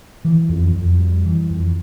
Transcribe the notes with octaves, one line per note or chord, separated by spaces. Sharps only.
E3
F2
F2
G3
E3
F2